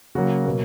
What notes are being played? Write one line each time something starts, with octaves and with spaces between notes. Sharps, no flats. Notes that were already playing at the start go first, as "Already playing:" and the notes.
C#3 F#3 A#3 F#4
B2 F#3 A#3